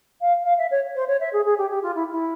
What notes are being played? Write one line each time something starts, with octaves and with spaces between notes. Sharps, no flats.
F5
F5
E5
C#5
C5
C#5
E5
G#4
G#4
G4
G4
F4
E4
E4